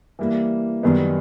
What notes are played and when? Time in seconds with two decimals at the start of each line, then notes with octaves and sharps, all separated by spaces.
0.19 E3 G3 A#3
0.83 F#2 D#3 G3 B3 D#4